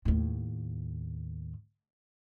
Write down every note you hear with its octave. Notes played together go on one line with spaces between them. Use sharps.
D#2 A2